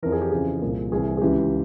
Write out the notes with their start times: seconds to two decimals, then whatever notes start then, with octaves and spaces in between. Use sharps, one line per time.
0.02 F2 E3 A#4
0.12 G#4
0.22 G4
0.31 F2 C#3 E3 G#4
0.62 C2 A#2
0.92 C2 C3 E3 G#4
1.17 G#4
1.22 C#2 C#3 E3 G4